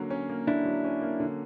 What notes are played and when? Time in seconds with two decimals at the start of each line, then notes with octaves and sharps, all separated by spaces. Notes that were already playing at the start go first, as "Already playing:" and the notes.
Already playing: D3 F#3 A#3 C#4
0.10 C#4
0.29 A#3
0.47 D3 D4 E4
0.65 F#3
0.84 C#4
1.02 A#3
1.20 D3